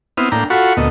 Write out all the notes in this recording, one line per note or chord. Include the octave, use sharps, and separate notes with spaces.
B3 C4 E4 D#6 F6
A2 A#3 D4 G5 A#5
F4 F#4 A4 F#5 B5 C#6
D2 A#2 A3 B3 D#5